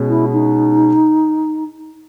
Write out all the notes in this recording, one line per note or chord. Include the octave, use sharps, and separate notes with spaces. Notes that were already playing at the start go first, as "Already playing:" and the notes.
Already playing: B2 G#3 C#4
E4
D#4